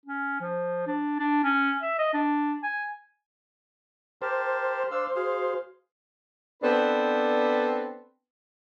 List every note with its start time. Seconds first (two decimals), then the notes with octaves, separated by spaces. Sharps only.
0.06 C#4
0.41 F3
0.87 D4
1.19 D4
1.44 C#4
1.82 E5
1.99 D#5
2.14 D4
2.63 G#5
4.22 G4 A#4 C5 A5
4.91 D4 F5 E6
5.16 F#4 G#4 F5
6.63 B3 C4 D4 A4 B4 C5